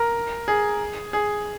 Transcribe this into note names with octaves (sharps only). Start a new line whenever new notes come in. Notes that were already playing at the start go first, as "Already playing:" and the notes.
Already playing: A#4
G#4
G#4